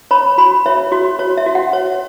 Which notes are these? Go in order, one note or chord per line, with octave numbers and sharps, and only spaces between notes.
C#5 B5
F#4 B5
C#5 E5
F#4 C#5
F#4 C#5
E5
F#4
F#5
C#5